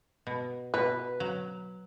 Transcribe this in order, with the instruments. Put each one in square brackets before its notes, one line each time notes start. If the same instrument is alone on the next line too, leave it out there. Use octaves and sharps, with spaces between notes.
[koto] B2
[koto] B2 [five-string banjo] B4
[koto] F#3